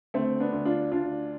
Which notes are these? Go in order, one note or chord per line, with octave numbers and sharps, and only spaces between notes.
D2 A3 C4
B3 D4
D2
D4 F4
D2 D4 F4